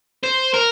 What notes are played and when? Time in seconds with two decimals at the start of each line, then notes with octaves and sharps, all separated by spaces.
0.24 C5
0.54 A#4